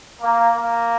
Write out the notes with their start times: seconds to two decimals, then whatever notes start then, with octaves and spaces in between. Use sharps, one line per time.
0.21 A#3
0.56 A#3